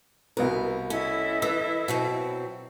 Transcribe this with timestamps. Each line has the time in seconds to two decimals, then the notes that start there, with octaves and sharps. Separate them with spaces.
0.37 C2 B2 A#4 B4
0.90 C#4 E4 A4 D#5
1.42 E3 B4 E6
1.88 B2 F#3 C4